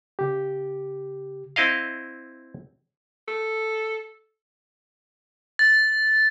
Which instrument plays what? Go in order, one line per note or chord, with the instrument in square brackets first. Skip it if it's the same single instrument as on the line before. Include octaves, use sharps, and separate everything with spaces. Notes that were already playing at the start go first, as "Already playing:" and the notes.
[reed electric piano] C#3 G4
[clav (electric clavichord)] C4 E4 D#5 F5
[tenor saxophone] A4
[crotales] A6